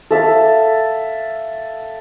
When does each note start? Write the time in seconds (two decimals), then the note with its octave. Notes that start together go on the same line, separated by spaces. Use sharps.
0.11 A4 E5 F5